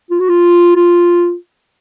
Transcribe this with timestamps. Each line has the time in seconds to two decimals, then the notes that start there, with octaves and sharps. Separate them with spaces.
0.10 F4
0.20 F#4
0.29 F4
0.76 F4